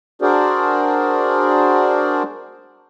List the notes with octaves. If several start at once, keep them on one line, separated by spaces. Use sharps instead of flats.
D4 F#4 G#4 A#4 C5 D5